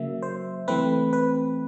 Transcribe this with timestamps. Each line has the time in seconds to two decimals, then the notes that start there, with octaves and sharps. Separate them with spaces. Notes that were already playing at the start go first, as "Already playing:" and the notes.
Already playing: C#3 F#3 A#3 E5
0.22 C5
0.68 E3 A3 C4 B4
1.13 B4